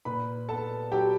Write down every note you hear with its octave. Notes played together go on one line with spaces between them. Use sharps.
A#2 B4 B5
B3 A4 A5
F#3 G4 G5